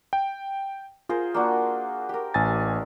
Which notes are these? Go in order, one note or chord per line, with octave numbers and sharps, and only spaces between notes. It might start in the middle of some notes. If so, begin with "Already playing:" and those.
G5
F4 G#4 A#4 C5
A#3 D4 F#4
G4 A#4
A1 G#5 A6